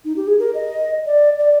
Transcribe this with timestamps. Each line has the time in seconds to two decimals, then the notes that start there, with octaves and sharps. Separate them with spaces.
0.05 D#4
0.16 G4
0.27 G#4
0.39 A#4
0.54 D#5
1.06 D5
1.39 D5